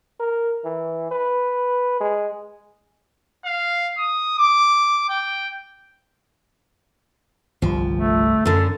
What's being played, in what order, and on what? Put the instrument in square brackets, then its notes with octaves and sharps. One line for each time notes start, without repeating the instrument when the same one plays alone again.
[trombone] A#4
E3
B4
G#3
[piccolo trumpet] F5
D#6
D6
G5
[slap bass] G1 C2 [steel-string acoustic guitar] F3
[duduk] A3
[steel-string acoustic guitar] F#2 D3 [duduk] A4